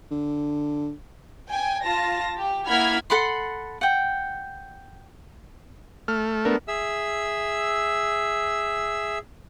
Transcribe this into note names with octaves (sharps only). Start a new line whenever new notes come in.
D3
G5 G#5
F4 A5 A#6
G4
A#3 E4 F#5 B5 F6 G#6
A4 F#5 B5 C6
F#5 G5
A3 F6
B3 D4 A#4
G#4 E5 E6